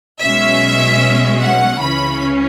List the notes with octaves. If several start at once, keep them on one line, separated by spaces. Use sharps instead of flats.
B1 B2 G#3 C#4 E5
F#5
C#2 C#3 E3 C#4 B5